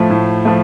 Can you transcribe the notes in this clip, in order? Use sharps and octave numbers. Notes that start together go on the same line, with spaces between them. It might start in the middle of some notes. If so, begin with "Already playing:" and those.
Already playing: A2 F3 A3
A2
F3 A3